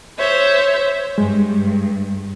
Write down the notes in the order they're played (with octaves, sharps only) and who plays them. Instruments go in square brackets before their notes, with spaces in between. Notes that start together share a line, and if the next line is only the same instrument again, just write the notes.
[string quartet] C5 C#5 E5
[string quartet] G2 [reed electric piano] G#3